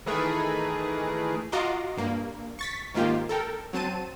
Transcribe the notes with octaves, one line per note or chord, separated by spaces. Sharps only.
D#3 E3 A3 G#4 A#4 B4
F4 F#4 D#5 A#5 C6 D6
G2 A#3
C#6 A6 B6
G#2 D#3 A#3 F4 G4
A4 A#4 G5
F#3 C4 A5 D#7